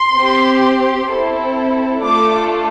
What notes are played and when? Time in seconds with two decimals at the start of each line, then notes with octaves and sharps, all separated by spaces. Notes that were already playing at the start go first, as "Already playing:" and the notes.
Already playing: C6
0.15 C4 G4
1.08 C4 E4 A4
2.02 A3 D4 F4 A4 D6